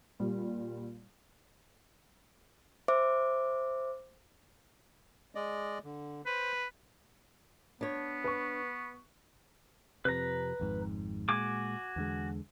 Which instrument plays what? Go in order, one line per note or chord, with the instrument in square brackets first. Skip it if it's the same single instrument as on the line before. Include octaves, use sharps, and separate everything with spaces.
[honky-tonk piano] A#2 G3
[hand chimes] C5 E5 D6
[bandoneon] G#3 D5 D#5
D3
[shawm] B4 [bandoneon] C5
[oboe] B3 [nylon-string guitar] D4 C#5
[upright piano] B4 C#6
[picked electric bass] F2 C3 [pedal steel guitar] B4 A#5
[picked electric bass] G#1 F2 G#2
[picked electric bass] A#2 G#3 [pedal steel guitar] F#4 G#5 D6
[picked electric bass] E2 D3 G#3